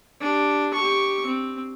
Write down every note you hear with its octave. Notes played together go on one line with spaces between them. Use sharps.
D4 G4
G4 C#6
C4